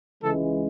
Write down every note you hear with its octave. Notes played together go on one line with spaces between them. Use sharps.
C#2 C#3 E3 G#3 A4